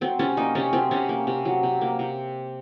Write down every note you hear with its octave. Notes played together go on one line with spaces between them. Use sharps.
F#3 C4
C3 C#4
A#3 D#4
C3 C#4
F#3 C4
C3 C#4
A#3
C3
F#3
C3
A#3
C3